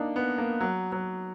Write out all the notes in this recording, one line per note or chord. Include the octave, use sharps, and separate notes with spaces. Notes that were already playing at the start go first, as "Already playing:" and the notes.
Already playing: A#3 D4 D#4
B3
A#3
F#3
F#3